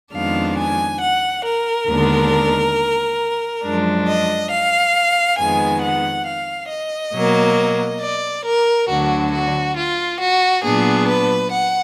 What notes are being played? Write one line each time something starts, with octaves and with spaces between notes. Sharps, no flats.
F2 D#3 G#3 B3 D4 F5
G#5
F#5
A#4
D#2 D3 G#3 B3 D4
F#2 F3 G#3 D4
D#5
F5
F2 D#3 G#3 B3 G#5
F#5
F5
D#5
B2 F#3 A#3
D5
A#4
D2 D3 F#3 D4 F#4
F#4
F4
F#4
A#2 F#3 B3 D4 G#4
B4
F#5